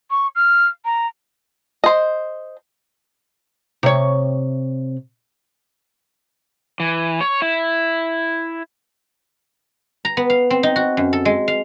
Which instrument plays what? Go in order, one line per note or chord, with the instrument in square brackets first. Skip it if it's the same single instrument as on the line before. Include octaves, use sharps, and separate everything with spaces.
[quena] C#6
F6
A#5
[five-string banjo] C5 D#5
[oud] C3 C#5
[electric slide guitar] E3
C#5
E4
[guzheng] A#5
B3
F5
C4
D#4
F#4
F#2
A4
G#3
F5